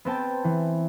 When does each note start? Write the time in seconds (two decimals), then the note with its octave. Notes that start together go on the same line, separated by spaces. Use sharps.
0.05 B3 C4 G5 A5
0.44 E3